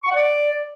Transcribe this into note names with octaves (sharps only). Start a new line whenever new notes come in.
C#6
F#5
D5